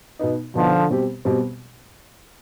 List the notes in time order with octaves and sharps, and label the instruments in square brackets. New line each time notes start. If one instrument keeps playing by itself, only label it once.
[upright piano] B2 B3 D#4
[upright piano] B2 B3 D#4 [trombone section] D3 F3
[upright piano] B2 G3 C4 G4
B2 G3 C4 G4